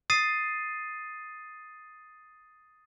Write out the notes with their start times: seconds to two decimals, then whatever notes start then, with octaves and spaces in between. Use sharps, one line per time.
0.10 D#6 A6 C7 D#7